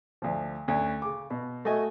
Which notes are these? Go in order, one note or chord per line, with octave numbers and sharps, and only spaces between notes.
D2 F3
D2 C#4
C#3 D6
B2
A3 F#4 D#5 G#5